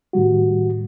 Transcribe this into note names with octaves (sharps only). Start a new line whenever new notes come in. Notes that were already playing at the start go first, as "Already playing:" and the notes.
A2 D#3 G3 F#4